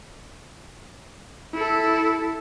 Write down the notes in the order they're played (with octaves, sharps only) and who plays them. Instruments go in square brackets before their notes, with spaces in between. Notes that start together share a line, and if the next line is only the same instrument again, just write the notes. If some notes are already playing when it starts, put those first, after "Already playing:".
[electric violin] E4 A4